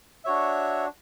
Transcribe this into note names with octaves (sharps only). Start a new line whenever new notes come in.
D4 F#4 C#5 E5